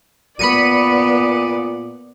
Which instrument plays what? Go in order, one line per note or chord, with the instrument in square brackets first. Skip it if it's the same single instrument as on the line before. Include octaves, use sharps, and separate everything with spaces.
[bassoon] A#2 [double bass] B3 [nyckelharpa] D5 [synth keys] B5 C#7 D#7